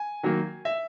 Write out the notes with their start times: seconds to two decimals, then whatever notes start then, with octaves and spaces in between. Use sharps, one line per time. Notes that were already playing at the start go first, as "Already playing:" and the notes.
Already playing: G#5
0.23 D#3 F#3 A#3
0.65 E5